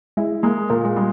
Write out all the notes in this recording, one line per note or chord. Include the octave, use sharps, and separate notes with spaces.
G#3 E4
G#3 A#3
A#2 A#3
G#3
G3 G#3